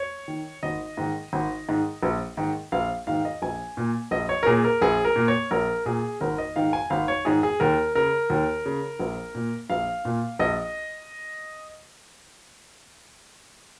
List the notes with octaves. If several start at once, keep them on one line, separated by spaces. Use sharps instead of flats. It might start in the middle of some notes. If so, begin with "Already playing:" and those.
Already playing: C#5
D#3
G#1 D#5
G#2 D#3
G#1
G#2 D#3
A#1
G#2 D#3
A#1 F5
G#2 D#3 F5
D#5
A#1 G#5
A#2
A#1 D#5
C#5
A#4
A#2 G#4
A#4
A#1 G#4
A#4
A#2
C#5
A#1 A#4
A#2 G#4
G#1 A#4
D#5
G#2 D#3 F5
G#5
G#1 F5
C#5
G#2 D#3 G#4
G#4
D#2 A#4
C#3 A#4
D#2
C#3
A#1
A#2
A#1 F5
A#2
A#1 D#5